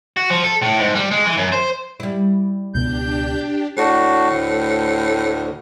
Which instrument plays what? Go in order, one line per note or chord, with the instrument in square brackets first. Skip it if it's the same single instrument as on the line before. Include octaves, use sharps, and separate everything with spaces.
[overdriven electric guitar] F#4
F3
A4
A2
G#2
G3
G#3
E3
F#2
C5
[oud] G3 E4
[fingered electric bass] C#2 B2 B3 [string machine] D4 G4 [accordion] G6
[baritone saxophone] A2 [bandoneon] D4 F#4
[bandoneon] D2 D3